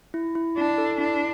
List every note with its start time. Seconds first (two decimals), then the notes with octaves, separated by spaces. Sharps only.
0.14 E4
0.35 E4
0.58 D4 E4
0.78 A4
1.00 D4 E4